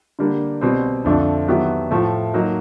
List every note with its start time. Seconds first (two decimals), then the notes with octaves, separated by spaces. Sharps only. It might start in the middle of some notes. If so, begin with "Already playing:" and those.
0.19 D3 G3 A#3 D4
0.61 B2 G3 C4
1.05 F2 D3 F3 A3 D4
1.48 D#3 F#3 B3 E4 G4
1.91 A2 F3 A3
2.34 F#3 A#3 D#4